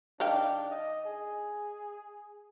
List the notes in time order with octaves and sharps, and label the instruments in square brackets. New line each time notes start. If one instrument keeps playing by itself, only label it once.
[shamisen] D#3 F5 G5 [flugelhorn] D4
[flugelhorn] D#5
G#4